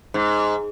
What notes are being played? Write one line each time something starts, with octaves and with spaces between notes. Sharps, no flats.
G#2